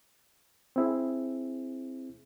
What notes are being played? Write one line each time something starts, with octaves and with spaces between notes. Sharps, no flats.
C4 E4 G#4